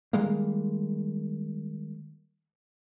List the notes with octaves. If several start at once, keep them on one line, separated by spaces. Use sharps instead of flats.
D#3 G3 G#3 A#3